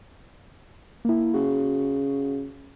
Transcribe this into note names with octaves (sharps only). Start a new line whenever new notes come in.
A#3 E4
C#3 F#4